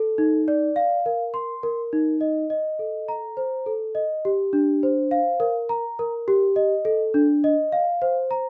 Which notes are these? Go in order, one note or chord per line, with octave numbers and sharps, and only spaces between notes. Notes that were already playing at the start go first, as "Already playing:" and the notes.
Already playing: A4
D#4
D5
F5
A#4
C6
A#4
D#4
D#5
D#5
A4
A#5
C5
A4
D#5
G4
D4
C5
F5
A#4
A#5
A#4
G4
D#5
A4
D4
D#5
F5
C5
A#5